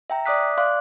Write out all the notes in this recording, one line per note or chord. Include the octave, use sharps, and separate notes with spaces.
E5 G5 A#5
D5 E5 D6 D#6 F#6 B6
D5 F5 C6 D6 F#6